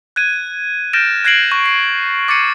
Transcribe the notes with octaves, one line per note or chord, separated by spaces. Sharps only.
F#6 G#6 D#7
F6 G6 A6 A#6 D7 E7
F#6 G#6 A#6 C7 D7 F#7
C#6
C7
D6 A6 C7 C#7 D#7